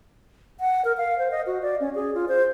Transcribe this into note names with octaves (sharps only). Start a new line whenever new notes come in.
F#5
A#4
F5
C5
D#5
F#4
D5
C#4
G#4
F4
C5